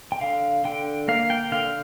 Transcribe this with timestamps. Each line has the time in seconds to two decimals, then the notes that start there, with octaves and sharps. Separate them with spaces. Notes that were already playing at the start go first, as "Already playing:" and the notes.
0.12 G5
0.21 D3 F5
0.64 D3 G5
1.08 A#3 F5
1.30 G5
1.51 D3 F5